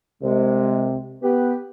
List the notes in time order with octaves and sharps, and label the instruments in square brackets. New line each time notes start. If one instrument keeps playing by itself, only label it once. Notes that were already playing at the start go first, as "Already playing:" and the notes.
[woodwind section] C2 G#3 [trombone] C3
[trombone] B3 [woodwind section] G4 B4